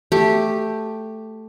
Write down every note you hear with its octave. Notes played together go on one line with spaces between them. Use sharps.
A3 G4